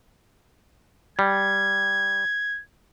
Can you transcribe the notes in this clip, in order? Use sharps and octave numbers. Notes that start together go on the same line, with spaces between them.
G3 G#6